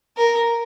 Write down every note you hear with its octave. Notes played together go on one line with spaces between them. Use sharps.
A#4